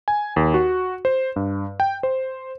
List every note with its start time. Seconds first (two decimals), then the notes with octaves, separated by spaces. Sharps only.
0.08 G#5
0.36 D#2
0.54 F#4
1.05 C5
1.36 G2
1.80 G5
2.03 C5